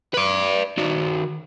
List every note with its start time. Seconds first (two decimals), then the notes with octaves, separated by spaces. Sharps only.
0.14 B4 D5
0.78 D#3 F#4